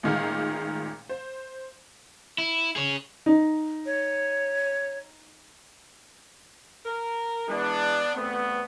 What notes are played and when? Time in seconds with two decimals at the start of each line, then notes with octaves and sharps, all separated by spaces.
0.03 A1 A#2 D#3 G#3 A#3 F5
1.09 C5
2.38 E4
2.76 G#4 C#5
3.26 D#4
3.86 C#5
6.85 A#4
7.48 E3 G#3 B3 D4
8.15 E2 G2 A3 B3 C4